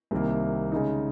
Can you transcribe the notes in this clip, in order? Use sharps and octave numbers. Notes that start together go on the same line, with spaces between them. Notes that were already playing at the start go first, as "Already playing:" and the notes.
C2 C3 D#3 A#3
C#3 G#3 D#4